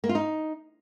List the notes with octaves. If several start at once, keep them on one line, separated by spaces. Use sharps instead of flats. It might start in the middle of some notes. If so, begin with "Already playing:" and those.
A#3
F4
D#4